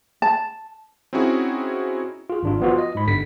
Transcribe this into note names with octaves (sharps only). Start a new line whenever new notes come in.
A5
C4 C#4 D#4 E4 F#4 G#4
F4 G#4
G#1 D4 F4
F3 B3 F4 F#4
D#5
G#2 B5
G1 D3 B6